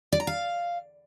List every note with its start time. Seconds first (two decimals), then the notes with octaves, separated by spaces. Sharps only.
0.12 D5
0.20 A#5
0.27 F5